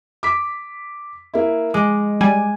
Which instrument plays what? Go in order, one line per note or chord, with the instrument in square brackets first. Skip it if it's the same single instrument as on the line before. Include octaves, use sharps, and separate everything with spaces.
[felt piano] D6 B6
A#3 E4
[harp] G#3 [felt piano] D6
[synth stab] G3 [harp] G#5